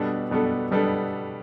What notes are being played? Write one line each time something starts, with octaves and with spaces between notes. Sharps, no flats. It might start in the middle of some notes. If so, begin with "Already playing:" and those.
Already playing: B2 G3 B3 D4 A4
B2 G3 B3 D4 A4
B2 G3 B3 D4 A4